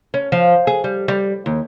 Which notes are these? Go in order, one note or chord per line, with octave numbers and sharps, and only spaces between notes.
C#4
F3
G#4
G3
G3
D#2